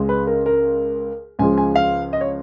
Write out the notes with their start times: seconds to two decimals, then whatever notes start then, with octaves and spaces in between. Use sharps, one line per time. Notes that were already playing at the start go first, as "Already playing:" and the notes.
Already playing: C#2 C#3 G#3
0.09 B4
0.27 A#4
0.46 A#4
1.39 C#2 C#3 F3 G#3 G#5
1.58 G#5
1.75 F5
2.13 D#5
2.21 C#5